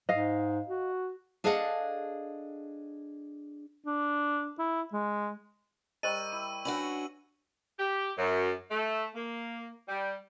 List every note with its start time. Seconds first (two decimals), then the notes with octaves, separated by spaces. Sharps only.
0.09 G#2 D#5 F5
0.68 F#4
1.44 D4 G#4 A4 D#5 F5 F#5
3.87 D4
4.59 E4
4.93 G#3
6.03 G3 G4 A#4 C5 D#5 C#6 E6 D#7
6.32 E4 D#7
6.65 C#4 D4 F#4 B4 F#5 F#7
7.78 G4
8.18 F#2
8.71 A3
9.15 A#3
9.88 G3